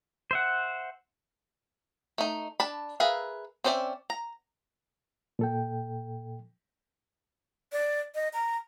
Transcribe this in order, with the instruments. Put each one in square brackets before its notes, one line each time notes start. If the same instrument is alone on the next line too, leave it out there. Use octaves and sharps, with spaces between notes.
[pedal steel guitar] C5 E5 F#5
[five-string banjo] A3 D#4
D4 A5 B5
G#4 A#4 B4 E5 F5
C4 C#4 C5 D5 E5
A#5
[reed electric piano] A#2 A4 G5
[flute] D5
D#5
A#5